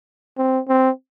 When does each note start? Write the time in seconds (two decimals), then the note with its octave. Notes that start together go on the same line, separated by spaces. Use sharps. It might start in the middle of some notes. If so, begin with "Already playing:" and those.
0.38 C4
0.68 C4